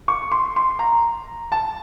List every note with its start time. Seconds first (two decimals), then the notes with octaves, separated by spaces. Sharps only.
0.08 C#6
0.32 C6
0.56 C6
0.79 A#5
1.52 A5